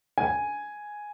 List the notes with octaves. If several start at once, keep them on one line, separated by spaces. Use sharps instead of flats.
G#5